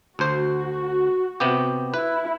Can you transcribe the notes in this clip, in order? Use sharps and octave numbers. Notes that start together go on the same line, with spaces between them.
D2 F#4 C5
C3 B3 G4
E4 B4